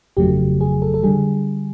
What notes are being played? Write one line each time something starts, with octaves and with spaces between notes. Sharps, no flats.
G1 F2 C#3 F#3 A3 G4
G#4
A4
A4
D3 G3 G#4